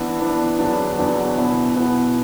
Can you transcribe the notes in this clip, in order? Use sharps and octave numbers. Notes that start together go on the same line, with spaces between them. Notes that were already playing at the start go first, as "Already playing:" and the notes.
Already playing: E3 B3 D4
E3 B3 D4
E2 D3 F#3 B3 D4
E2 D3 F#3 B3 D4
B2 B3 E4
B2 B3 E4